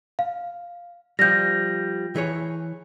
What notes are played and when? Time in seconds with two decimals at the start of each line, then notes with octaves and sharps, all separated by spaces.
0.19 F5
1.19 F3 G3 G6 A#6
2.16 E3 G#4 C#5